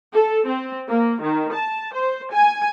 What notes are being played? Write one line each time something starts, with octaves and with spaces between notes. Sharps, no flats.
A4
C4
A#3
D#3
A5
C5
G#5